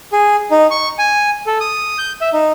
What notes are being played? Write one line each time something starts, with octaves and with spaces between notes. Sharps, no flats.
G#4
D#4
C#6
G#5
A4
D#6
G6
E5
D#4